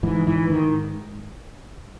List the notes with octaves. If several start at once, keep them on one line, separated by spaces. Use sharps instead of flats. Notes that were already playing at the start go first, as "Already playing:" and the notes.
G#2 E3
E3
G#2 D#3